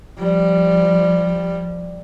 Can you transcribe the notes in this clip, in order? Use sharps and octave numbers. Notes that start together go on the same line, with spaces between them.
F3 G3